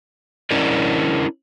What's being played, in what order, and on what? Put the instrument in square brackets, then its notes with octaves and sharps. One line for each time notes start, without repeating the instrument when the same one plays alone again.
[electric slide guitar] C#4 D4 E4 A#4 D5 D#5